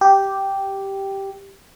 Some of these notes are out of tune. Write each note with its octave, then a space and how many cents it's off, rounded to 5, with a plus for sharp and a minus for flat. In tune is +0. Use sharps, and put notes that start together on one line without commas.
G4 -5